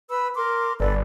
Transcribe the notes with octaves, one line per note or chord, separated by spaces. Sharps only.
B4 B5 E6
A#4 C6 D6
G1 A4 B4 D5